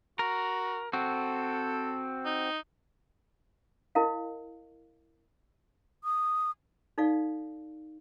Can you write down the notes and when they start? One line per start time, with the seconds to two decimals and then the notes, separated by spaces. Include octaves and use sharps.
0.19 F#4 A#4
0.93 C4 F#4 A4
2.25 D#4
3.95 E4 A#4 D#5 F5
6.04 D#6
6.98 D#4 A4 D5 F5